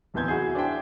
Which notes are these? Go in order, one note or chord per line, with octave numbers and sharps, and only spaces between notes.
D1 E2 C3 E3 G6 G#6
E4 F#4 G#4
D4 C5 E5 G5